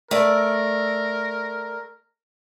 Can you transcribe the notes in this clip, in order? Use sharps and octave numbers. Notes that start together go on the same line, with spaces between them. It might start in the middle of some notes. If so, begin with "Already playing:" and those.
A3 A#4 D5